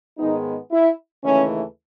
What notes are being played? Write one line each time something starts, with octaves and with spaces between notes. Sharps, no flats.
G#2 D#3 G#3 B3 D#4
E4
D#2 C#3 E3 A3 C#4